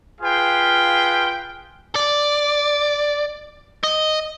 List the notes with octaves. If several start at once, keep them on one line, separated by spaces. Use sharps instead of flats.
F4 G#4 B4 F5 G5
D5
D#5